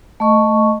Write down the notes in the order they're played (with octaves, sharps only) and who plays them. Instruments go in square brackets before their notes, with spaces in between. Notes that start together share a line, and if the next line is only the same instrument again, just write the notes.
[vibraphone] A3 D#5 C#6